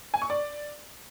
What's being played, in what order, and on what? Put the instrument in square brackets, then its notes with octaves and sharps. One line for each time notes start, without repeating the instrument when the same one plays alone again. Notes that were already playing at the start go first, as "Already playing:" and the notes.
[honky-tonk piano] G#5
C#6
D5